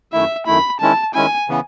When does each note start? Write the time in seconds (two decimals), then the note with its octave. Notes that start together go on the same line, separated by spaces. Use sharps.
0.13 F#2 D#3 A3 E4 E5
0.46 F#2 D#3 A3 E4 B5
0.80 D#3 G#3 C#4 E4 A5
1.14 D#3 G#3 C#4 E4 G#5
1.49 C#3 E3 B3